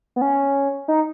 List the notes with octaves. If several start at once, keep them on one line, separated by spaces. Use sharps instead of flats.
B3
C#4
D#4